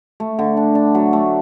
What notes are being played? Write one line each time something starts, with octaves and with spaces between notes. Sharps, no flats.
A3
D3
D4
D4
F#3
A3